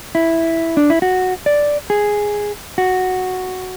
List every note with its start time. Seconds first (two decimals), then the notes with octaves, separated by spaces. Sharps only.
0.15 E4
0.77 D4
0.90 E4
1.02 F#4
1.46 D5
1.90 G#4
2.78 F#4